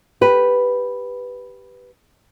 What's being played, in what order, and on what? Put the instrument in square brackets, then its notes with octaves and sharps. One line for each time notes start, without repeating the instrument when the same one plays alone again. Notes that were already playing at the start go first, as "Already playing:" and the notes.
[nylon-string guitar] G4 B4